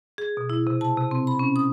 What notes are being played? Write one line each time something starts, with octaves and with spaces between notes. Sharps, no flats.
G#4
B2
E4
C3
A5
C3
C4
B5
C#4
D#6